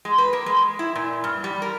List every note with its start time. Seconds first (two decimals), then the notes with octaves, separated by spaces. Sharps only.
0.05 G#3
0.18 B4
0.33 A#3
0.46 G#3
0.79 E4
0.95 A#2
1.24 G2
1.44 G3
1.62 A#4